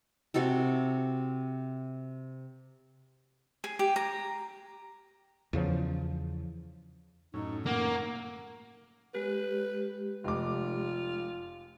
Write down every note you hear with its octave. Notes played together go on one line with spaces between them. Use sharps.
C3 F#4 G#4 A4
G#4
G4
A#5
E2 C#3 F3
F#2 A2 C#4 D#4
A#3 F#5
G#3 G4 B4
F1 F4 D6